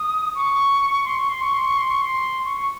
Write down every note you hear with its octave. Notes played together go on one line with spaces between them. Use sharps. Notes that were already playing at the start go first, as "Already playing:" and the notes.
Already playing: D#6
C#6
C6
C#6
C6
C#6
C6
C#6
C6
C#6
C6
C#6
C#6